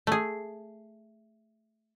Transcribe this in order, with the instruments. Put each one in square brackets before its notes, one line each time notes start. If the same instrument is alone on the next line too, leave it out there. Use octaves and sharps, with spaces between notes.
[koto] A3 G#4